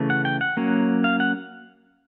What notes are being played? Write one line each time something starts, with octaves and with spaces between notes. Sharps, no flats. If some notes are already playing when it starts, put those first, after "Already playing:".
Already playing: C#3 E3 A3
F#5
G5
F#5
F#3 A#3 C#4
F5
F#5